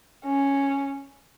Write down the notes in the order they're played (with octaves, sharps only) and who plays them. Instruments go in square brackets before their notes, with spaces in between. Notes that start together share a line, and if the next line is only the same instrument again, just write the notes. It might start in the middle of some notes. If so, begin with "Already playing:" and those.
[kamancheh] C#4